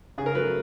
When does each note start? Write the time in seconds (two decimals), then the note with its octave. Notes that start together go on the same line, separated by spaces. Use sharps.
0.18 C#3 G#4
0.26 A#4
0.35 F#3 A3 B4